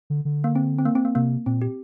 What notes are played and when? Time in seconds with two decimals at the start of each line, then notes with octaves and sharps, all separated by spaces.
0.10 D3
0.25 D3
0.44 A#3
0.55 C4
0.78 C4
0.85 A#3
0.95 C4
1.05 A#3
1.15 C3 A#3
1.46 A#2 C4
1.62 G4